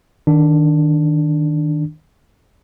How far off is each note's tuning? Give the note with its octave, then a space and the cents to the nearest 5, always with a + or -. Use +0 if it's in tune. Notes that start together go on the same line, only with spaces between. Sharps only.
D#3 +0 D4 +0